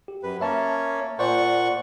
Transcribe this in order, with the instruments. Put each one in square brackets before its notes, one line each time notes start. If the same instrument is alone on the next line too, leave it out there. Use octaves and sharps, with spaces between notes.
[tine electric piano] G4
[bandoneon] F#2 B4
[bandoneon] A#3 C#4 C#5 [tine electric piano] E5 A5
[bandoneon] A#2 F#5 C#6 [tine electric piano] C5 D5